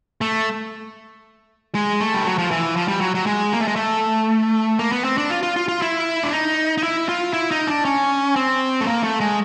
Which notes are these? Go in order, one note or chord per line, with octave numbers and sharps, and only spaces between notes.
A3
G#3
A3
G3
F#3
F3
E3
F3
G3
F#3
F#3
G#3
A#3
A3
G#3
A3
A#3
B3
C4
D4
F4
F4
F4
F4
E4
D4
D#4
D#4
E4
F4
E4
D#4
D4
C#4
C4
A3
A#3
A3
G#3